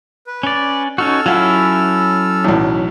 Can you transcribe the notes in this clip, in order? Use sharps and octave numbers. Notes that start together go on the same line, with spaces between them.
B4
C#4 D5
C#4 D#4 F#4 A4 E6 F6
F#3 C#4 E4 F4 F#5
B1 E2 A2